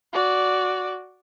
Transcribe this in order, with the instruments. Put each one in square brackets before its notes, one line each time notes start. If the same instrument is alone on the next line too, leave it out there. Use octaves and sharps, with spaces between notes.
[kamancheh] F#4 D5